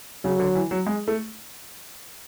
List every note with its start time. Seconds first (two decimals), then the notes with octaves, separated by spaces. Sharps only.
0.24 C#3 F#3
0.39 D3
0.55 E3
0.71 F#3
0.87 G#3
1.08 A3